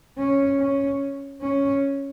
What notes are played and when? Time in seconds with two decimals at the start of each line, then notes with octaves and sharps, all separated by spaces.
0.18 C#4
0.59 C#4
1.42 C#4